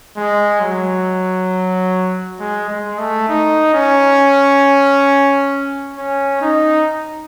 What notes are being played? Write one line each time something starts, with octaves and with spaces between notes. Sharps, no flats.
G#3
F#3
G#3
G#3
A3
D#4
C#4
C#4
D#4